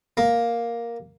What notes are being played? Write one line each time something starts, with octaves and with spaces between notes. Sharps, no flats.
A#3